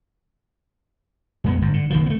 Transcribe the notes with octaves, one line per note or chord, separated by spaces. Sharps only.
F2 G#3 B3
G1 G#2
D3
F#1 D#3 F3
A3 B3